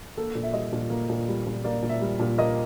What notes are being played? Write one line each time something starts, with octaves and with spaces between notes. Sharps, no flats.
A#3 A4
A#2
E5
G3 D#5
A#2
A#3
A#2
G3
A#2
A#3 D5
A#2
E5
G3
A#2
A#3 D#5